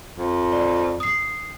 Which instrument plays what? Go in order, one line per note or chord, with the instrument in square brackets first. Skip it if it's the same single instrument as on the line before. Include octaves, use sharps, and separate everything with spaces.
[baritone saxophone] F2
[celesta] D5
D#6 C7